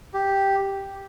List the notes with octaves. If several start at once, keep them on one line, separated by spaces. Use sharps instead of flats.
G4